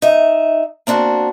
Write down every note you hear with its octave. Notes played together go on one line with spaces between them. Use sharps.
D#4 E5
A#3 C4 D4 F#4